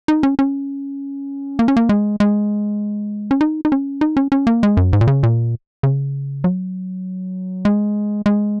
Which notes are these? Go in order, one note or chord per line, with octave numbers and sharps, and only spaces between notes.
D#4
C#4
C#4
A#3
C#4
A#3
G#3
G#3
C#4
D#4
D#4
C#4
D#4
C#4
C#4
A#3
G#3
F#2
G#2
A#2
C#3
A#2
C#3
F#3
G#3
G#3